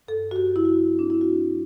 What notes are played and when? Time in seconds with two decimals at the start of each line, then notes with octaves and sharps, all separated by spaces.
0.08 G2 A4
0.31 F#4
0.36 G2 G4
0.56 E4
0.65 F#3 F#4
0.93 C4
0.99 D4
1.10 E4
1.21 C4 F#4
1.50 F#3